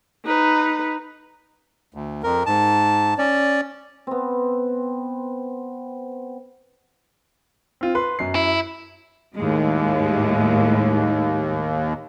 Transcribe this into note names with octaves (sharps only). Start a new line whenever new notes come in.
D#4 B4
D2
F2 A#4
G#2 A5
C#4 D5
B3 C4
C4 F4
B4 C6
F#2 C7
E4
D#2 A2 G#3